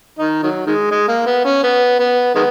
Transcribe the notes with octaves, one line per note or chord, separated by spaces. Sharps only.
D#3 D#4
D#3 F#3
D#3 G#3
G#3
A#3
B3
C#4
B3
B3
D#3 G#3 B3